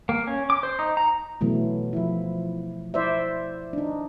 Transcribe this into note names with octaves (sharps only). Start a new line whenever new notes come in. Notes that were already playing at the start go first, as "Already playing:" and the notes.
A#3
C#4
D6
C5
D#4
A#5
B2 E3 F#3 A3
F3 E4
E4 C5 D5 E5
D4 D#4